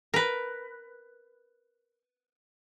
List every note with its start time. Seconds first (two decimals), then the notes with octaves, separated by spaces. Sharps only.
0.14 A#4 B4